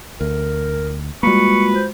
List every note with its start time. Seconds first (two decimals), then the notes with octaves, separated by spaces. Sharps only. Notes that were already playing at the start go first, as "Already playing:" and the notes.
0.21 D2 A#4
1.23 G3 G#3 A#3 F4 F#4 B4 C#6
1.74 C5